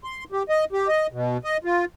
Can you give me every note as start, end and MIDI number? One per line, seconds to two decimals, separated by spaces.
0.04 0.24 84
0.32 0.43 67
0.49 0.65 75
0.73 0.88 67
0.88 1.07 75
1.12 1.37 47
1.44 1.57 75
1.64 1.85 65